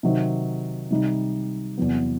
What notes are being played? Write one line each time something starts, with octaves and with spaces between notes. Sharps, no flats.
C3 D#3 F#3 C4
C3 D#3 G3 D#4
E2 C3 F#3 B3